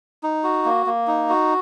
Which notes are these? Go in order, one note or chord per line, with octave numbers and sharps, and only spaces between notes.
D#4
F#4
A#3
A#3
D#4
F#4